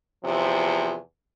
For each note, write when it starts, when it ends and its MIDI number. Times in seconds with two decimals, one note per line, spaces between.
0.23 0.95 40
0.23 0.95 48
0.23 0.95 53